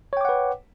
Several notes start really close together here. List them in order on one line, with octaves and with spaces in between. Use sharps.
C#5 G5 D6 F#5 B4